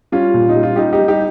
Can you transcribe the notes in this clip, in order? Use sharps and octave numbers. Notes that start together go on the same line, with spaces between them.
G3 C#4 F4
A#2
D#4
G3
F4
G3 D#4 G4
D#4 G4
G3
D#4 G4